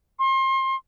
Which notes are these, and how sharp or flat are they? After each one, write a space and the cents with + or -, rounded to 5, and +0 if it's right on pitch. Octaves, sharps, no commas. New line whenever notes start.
C6 +30